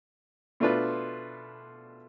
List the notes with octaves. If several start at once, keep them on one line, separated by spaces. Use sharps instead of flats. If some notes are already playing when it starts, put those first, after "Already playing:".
B2 A3 D4 F4 B4